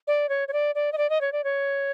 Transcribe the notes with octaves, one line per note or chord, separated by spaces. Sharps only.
D5
C#5
C#5
D5
D5
D#5
D5
D#5
C#5
D5
C#5